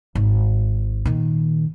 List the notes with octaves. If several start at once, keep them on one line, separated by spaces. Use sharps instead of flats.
G#1
A#2 D#3